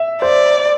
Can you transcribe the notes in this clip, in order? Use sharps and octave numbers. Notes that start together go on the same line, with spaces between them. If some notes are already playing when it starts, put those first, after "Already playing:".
Already playing: E5
C5 D5